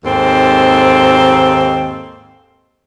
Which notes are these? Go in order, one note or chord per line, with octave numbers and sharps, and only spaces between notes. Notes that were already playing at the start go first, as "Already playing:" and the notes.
D#2 G#2 C4 A4